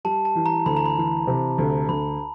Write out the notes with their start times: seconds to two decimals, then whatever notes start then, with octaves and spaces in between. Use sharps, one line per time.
0.05 G3 A5
0.25 A5
0.35 E3
0.46 A#5
0.66 D2 B5
0.76 A#5
0.86 B5
0.97 E3
1.27 C3
1.58 D2
1.89 D2 B5